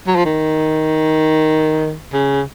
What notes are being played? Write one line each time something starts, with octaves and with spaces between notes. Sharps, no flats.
F#3
F3
D#3
C#3